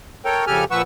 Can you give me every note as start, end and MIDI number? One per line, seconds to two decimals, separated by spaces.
0.25 0.45 69
0.25 0.45 70
0.25 0.45 73
0.25 0.45 79
0.47 0.64 41
0.47 0.64 49
0.47 0.64 67
0.47 0.64 69
0.47 0.64 80
0.47 0.64 89
0.71 0.82 46
0.71 0.82 53
0.71 0.82 71
0.71 0.82 78
0.71 0.82 85
0.71 0.82 88